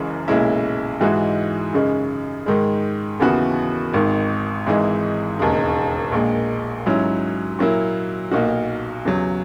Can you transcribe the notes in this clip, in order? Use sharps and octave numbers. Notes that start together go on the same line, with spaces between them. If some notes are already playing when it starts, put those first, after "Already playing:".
Already playing: F#1 F#2 C#3 E3 G#3
B1 A#2 G#3 C#4 E4
G#2 E3 G#3 D#4 F#4
F#2 C#3 G#3 D#4
G#2 D#3 G#3
D#2 C#3 E3 B3 F#4
G#1 G#2 D#3
G#1 G#2 E3 G#3 D#4
E1 D#2 C#3 G#3 D#4
A#1 A#2 G#3
G#2 F#3 C#4 E4
A#2 F#3 A#3 E4
B1 A#2 A#3 D#4 F#4
E2 C#3 F#3